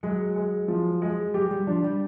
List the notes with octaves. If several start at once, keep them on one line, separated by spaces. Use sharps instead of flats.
F#3 G#3
G#3
F3
G#3
F#3 G4
G3
F3 D4
G3